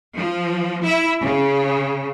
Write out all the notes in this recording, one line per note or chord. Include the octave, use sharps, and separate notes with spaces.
F3
E4
C#3